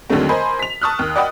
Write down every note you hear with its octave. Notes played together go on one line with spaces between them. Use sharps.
D#2 D3 F#3 G#3 A3 C4
A#4 C5 D#5 G#5 B5 C6
B6 F7
A5 C#6 D#6 F6 F#6
D#2
D5 D#5 F#5 G5 B5 D#6